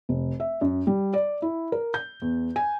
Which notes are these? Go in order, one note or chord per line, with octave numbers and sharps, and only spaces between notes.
F1
E5
F#2
G3
D5
E4
A#4
G6
E2
G#5